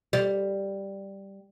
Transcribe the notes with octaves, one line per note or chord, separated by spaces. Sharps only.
G3